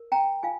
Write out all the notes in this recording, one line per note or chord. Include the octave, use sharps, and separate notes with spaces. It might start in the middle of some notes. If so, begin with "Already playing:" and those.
Already playing: A#4
G5 A#5
F4 F5 G#5